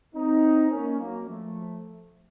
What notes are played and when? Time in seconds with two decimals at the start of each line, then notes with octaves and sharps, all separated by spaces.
0.14 C4 D#4
0.71 A#3 C#4
0.99 F#3 A#3
1.28 F3 A3